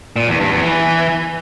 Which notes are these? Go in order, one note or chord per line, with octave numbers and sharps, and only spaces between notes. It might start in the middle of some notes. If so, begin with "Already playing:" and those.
A#2
E2
G2
E2
E3